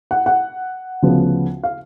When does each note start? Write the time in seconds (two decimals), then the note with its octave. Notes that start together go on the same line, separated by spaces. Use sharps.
0.11 F#5
0.26 F#5
1.02 D2 C#3 F3 B3
1.63 F5